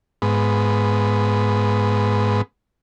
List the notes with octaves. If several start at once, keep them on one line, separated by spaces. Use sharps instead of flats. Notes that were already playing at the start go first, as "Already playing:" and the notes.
G#2 B3